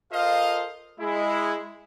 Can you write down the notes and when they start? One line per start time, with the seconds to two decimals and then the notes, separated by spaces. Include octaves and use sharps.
0.13 F4 A4 A#4 C5 D#5 F5
1.00 G#3 E4